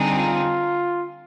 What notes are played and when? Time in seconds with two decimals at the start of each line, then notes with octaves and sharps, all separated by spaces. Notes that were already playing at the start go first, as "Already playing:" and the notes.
Already playing: D3 G3 C4 D#4 G#4
0.17 F4